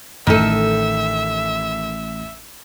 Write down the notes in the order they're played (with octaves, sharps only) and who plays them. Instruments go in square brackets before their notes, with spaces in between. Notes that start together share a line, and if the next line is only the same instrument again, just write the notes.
[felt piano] A1 D#7 [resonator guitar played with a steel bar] D#3 A4 [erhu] E5